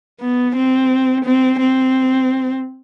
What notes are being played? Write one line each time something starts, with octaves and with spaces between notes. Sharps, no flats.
B3
C4
C4
C4